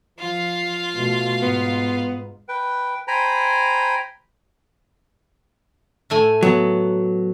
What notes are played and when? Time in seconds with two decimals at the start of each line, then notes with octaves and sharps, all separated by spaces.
0.19 F3 F4 F5
0.96 B2 A3
1.42 G#2 B3
2.49 B4 G5
3.08 C5 G5 G#5 A#5 B5
6.10 A2 A3 G#5
6.43 F#3 B3